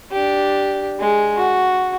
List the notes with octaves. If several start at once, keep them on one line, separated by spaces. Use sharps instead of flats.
D4 G4
G#3
F#4